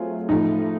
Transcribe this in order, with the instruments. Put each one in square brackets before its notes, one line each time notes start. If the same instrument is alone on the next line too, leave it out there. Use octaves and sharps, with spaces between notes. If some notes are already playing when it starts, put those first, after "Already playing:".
Already playing: [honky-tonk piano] F#3 A3 C4 G#4 [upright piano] F4
[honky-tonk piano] A2 F3 A3 [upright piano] D#4